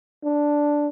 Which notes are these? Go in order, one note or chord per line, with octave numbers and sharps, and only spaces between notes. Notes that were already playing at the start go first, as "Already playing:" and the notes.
D4